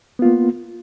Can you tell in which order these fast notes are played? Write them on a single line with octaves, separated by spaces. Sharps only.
B3 F4 A#3